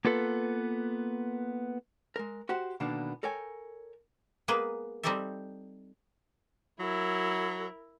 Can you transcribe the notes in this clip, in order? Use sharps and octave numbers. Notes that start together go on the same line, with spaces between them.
A#3 B3 F4 A4 B4
G#3 A#4
F#4 G4 C5 F#5
B2 D3 D#3 A#3 B3 D4
A4 A#4 C#5 G5 G#5
G#3 A#3 B3 G#4 B4
G3 C4 D#4 G4 A4 E5
F#3 E4 A#4